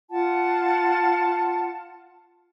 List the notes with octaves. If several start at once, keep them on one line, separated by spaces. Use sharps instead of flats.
F4 F#5 A5